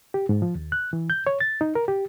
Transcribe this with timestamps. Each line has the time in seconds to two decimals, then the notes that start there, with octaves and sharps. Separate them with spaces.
0.14 G4
0.29 G#2
0.42 F3
0.55 D#2
0.72 F#6
0.93 E3
1.10 G6
1.27 C#5
1.40 A6
1.61 D#4
1.75 A#4
1.88 G4